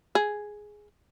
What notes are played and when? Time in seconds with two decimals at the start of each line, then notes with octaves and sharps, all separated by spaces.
0.15 G#4